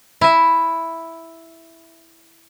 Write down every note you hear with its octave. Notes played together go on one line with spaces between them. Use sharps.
E4 E5